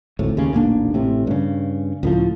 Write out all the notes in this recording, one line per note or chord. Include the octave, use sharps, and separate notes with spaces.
G#1 D2 A2
D#2 C#3
D#1 A1 A#3 D4
A1 A2 C3
G2 C#3
C#2 A2 F3